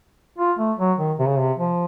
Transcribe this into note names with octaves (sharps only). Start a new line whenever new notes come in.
F4
A3
F#3
D#3
C3
C#3
C3
F3